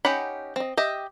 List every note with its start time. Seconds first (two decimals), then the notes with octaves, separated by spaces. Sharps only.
0.05 C#4 D#4 G4 F#5 B5
0.56 C4 D#5
0.77 G4 D#5 E5